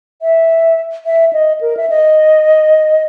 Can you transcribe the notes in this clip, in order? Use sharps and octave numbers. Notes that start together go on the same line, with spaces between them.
E5
E5
D#5
A#4
E5
D#5